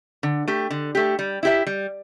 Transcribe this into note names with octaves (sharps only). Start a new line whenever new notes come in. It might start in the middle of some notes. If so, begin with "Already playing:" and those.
D3
A3 G4
D3
A3 G4
G3
E4 G4 E5
G3